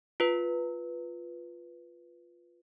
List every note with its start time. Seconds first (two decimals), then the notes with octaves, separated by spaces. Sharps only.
0.20 F4 B4